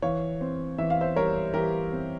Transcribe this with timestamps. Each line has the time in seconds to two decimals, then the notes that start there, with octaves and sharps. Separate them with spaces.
0.02 E3 C#5 F5
0.41 C4
0.78 E3 E5
0.90 F5
1.01 C5 E5
1.16 G3 A#4 C#5
1.54 E3 G4 A#4
1.93 C4